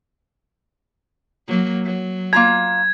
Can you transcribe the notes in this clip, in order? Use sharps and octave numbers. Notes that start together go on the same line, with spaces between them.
F#3 A#3
F#3
A#3 F4 A#5 G#6